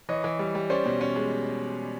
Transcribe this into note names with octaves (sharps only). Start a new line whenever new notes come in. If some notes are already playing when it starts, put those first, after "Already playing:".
E3 C#5 D#5
E3
G3
G3
C#4 C5 D5
B2
C#4
G#3